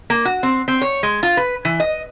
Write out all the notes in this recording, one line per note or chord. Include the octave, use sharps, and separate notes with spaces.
A#3
F#4
C4
C4
C#5
G#3
F4
B4
E3
D#5